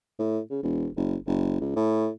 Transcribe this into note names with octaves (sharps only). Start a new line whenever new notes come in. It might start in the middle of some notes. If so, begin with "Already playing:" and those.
A2
C#3
E1
F#1
F#1
C#2
A2